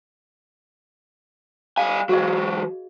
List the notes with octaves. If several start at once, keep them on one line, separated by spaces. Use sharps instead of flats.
G3 F5 G#5
E3 F#3 F#4 G#4 D#5